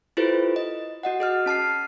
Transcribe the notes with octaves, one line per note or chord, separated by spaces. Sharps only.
E4 F4 G4 A4 B4 C5
D#5
F#4 D#5 F#5
G#4 D#5 F6
C#4 A5 F6 C7